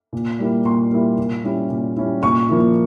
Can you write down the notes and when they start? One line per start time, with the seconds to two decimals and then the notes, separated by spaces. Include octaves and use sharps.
0.13 A#2
0.39 G3 A#3 E4
0.65 A#2 C6
0.91 G3 A#3 E4
1.18 A#2
1.44 G3 C#4 E4
1.70 A#2
1.97 G3 C#4 E4
2.23 A#2 C#6
2.49 F3 A#3 E4